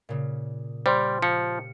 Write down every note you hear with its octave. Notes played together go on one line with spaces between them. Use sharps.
A#2 C#3
G3 G4 C5 F5 G5 C6
F3 C#7